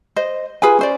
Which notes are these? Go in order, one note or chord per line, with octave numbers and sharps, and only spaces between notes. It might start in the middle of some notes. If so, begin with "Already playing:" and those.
C5 D#5
F4 G#4 B4 G#5
C#4 C5 D5